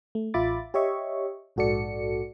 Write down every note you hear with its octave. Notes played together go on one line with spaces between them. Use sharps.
A3
A1 F4 E5 B5 D6 A6
G4 C#5 D#5 E5 C#6
A#1 G#2 F#4 A4 D5 C#7